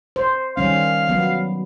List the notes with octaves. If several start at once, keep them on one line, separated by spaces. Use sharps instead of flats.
C5
D#3 G3 C#4 F5
F#3 B3